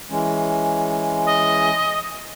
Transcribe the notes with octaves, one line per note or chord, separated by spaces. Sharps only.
E3 G#3 C#4
D#5